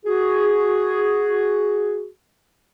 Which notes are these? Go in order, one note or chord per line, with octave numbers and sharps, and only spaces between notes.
F#4 G#4